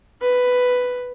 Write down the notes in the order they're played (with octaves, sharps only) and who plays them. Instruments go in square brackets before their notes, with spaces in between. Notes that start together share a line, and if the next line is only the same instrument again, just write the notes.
[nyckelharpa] B4